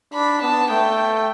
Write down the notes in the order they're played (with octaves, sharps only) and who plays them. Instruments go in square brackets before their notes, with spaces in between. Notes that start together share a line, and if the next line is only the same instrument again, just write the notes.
[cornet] D4 [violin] B5
[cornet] B3 [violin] A5
[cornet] A3 [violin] G5